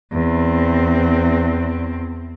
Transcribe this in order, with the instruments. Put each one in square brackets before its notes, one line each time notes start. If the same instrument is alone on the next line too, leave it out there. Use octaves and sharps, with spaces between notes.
[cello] E2 C4